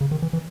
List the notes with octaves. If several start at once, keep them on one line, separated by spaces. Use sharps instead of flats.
C#3
D#3
E3
E3